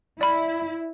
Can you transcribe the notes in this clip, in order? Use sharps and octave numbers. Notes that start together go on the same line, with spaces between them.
E4 D5 B5